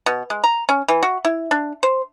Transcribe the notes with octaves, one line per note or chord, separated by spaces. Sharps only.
B2
G#3
A#5
C#4
E3
F#4
E4
D4
C5